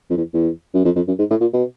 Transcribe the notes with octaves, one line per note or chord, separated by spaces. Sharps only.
F2
E2
E2
F#2
F2
F2
F#2
G#2
A2
A#2
B2